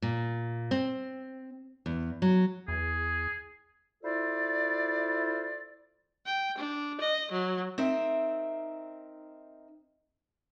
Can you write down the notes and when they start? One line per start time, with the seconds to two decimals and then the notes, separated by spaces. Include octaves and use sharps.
0.02 A#2
0.71 C4
1.86 E2
2.22 F#3
2.68 E2 G#4
4.03 E4 F4 A4 C5 D5
6.24 G5
6.56 D4
6.99 D#5
7.29 F#3
7.78 C4 D#4 A#4 E5